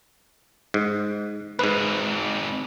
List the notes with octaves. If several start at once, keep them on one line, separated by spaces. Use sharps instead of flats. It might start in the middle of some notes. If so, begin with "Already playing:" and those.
G#2
G#2 C4 D#4 B4